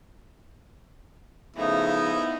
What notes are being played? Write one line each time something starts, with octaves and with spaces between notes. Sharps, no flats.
C#3 F3 A3 B3 D#4 E4